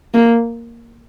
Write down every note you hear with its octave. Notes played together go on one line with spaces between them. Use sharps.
A#3